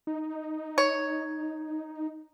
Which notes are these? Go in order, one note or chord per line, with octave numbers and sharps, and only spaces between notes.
D#4
C#5